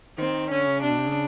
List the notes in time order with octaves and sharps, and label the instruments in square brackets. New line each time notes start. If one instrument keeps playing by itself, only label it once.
[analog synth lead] D#3 [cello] C4
[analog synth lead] D3 [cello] C#4
[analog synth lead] C#3
[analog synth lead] C3 [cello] D4
[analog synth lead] B2
C3
C#3